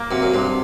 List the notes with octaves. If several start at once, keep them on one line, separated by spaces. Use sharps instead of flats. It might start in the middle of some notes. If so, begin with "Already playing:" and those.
Already playing: A#3
F#2 C3
F#2
G2 C3